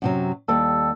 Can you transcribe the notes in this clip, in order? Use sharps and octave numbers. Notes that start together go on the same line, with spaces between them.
F#2 C3 F#3
D#2 G3 A4